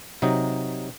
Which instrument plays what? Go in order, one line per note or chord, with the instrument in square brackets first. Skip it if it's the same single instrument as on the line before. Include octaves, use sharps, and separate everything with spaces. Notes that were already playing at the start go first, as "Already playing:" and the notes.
[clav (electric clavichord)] C3 F#3 D#4